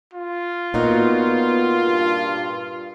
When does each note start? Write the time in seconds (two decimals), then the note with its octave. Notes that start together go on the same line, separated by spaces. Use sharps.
0.13 F4
0.74 A#2 B3 D#4 F#4
1.83 G2